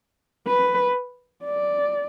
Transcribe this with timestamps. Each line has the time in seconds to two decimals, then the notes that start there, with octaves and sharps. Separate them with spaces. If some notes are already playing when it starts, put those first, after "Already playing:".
0.47 B4
1.45 D5